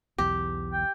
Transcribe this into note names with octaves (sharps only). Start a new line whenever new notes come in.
B1 E2 G4
G5